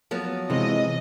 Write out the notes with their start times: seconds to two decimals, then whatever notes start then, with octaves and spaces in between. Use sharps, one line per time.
0.11 F3 F#3 B3
0.50 C3 E3 G#3 D#5